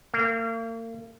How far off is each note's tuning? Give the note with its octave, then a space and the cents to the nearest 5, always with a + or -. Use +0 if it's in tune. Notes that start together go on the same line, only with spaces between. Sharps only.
A#3 -40